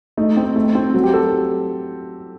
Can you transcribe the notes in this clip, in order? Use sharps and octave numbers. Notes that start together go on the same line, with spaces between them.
A3 D#4
C4
A3
C4
F#3 F#4
G4
A4